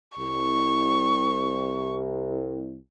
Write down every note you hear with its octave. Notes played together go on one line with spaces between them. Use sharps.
C2 C#6